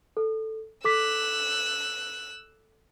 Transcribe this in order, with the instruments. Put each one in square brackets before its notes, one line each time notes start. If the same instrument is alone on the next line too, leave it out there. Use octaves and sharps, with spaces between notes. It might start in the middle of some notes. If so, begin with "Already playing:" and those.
[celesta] A4
[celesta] A4 D6 B6 [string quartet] E6 F#6